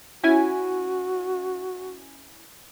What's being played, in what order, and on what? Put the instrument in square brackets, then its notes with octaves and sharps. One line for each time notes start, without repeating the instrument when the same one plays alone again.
[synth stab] C#4 E4 G#5 [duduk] F#4